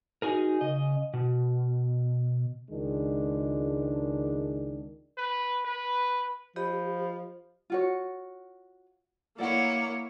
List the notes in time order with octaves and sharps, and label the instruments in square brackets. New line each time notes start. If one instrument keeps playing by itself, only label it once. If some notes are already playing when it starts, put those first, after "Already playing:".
[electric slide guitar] D#4 F#4 G#4 A#4
C#3 D#5
B2
[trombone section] C#2 D#3 G#3 D4
[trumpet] B4
B4
[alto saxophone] F3 [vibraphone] G4 D#5 B5
[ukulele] F4 F#4 C#5
[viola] A#3 [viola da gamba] E4 C#5 [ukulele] A4 D5 F#5